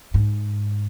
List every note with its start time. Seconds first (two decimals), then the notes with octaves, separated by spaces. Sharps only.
0.14 G#2